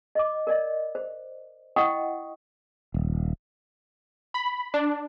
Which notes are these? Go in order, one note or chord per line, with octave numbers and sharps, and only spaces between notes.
D#5 D6
A#4 D5 D#5
C5
E4 D#5 F#5 G5 C#6 D#6
D#1
B5
D4